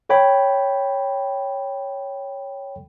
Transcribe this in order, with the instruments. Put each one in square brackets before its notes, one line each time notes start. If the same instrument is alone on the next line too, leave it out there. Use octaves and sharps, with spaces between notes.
[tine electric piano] A4 C#5 G5 B5